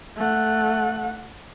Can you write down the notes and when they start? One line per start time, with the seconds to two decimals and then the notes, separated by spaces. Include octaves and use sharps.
0.17 A3 F#5